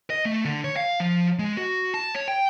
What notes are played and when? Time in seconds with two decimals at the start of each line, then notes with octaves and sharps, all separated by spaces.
0.10 D#5
0.26 A3
0.45 D3
0.64 C#5
0.76 F5
1.00 F3
1.39 G#3
1.57 F#4
1.94 A5
2.15 C#5
2.28 G5